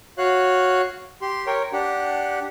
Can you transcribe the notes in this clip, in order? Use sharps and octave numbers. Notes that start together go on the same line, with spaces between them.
F#4 C#5 F5 F#6
G4 C6
A#4 C#5 G5
D4 G4 F#5